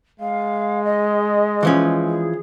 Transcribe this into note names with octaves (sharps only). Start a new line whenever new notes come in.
G#3 F5
D#5
E3 F3 C#4
G#4